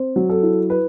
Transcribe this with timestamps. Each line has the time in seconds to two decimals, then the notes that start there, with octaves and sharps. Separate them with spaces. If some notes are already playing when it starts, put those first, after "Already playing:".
Already playing: C4
0.16 F#3
0.30 A4
0.43 E4
0.70 B4